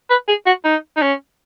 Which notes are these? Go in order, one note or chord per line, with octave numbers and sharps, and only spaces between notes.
B4
G#4
F#4
D#4
D#4
C#4